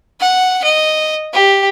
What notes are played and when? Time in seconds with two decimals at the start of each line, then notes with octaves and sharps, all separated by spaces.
0.20 F#5
0.64 D#5
1.33 G4